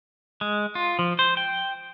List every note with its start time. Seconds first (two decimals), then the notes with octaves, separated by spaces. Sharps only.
0.41 G#3
0.75 F4
0.99 F3
1.19 C5
1.37 G5